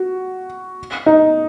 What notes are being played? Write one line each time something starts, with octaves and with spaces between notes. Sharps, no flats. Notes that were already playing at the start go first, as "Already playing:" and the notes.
Already playing: F#4
D#4